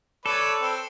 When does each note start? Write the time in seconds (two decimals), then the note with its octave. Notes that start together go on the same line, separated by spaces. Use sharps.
0.26 A4 B4 C#5 D5
0.61 C4